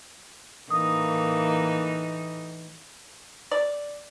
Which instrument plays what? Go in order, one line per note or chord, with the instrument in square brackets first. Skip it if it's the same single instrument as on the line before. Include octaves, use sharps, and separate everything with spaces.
[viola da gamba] A2 E3 D#4 [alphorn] A#3 [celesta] D#6
[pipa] D5